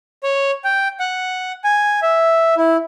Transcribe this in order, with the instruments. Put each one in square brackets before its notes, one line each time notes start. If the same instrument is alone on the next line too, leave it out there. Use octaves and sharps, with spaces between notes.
[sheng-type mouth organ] C#5
G5
F#5
G#5
E5
E4